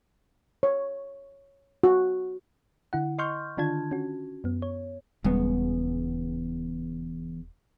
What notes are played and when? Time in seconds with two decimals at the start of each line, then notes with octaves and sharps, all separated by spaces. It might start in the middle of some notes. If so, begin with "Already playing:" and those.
0.63 C#5
1.83 F#4
2.93 D3 E4 F#5
3.18 D#5 C6 C#6 F6 G6
3.57 D3 D#3 D4 F4 A5 G#6
3.91 C#4 F#4
4.44 F#2 B3
4.62 C#5
5.24 D#1 E2 C#3 G3 G#3 B3